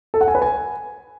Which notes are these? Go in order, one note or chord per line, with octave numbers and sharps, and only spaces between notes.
A4
F#5
G#5
B4
G#5